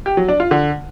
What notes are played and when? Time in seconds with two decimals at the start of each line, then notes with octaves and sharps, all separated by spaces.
0.06 G4
0.17 F#3
0.28 D4
0.40 F4
0.51 D3